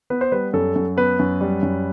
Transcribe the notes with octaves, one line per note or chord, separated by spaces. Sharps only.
B3 B4
C5
G3 B4
F#2 A4
F#2
B3 B4
F#2
G3
F#2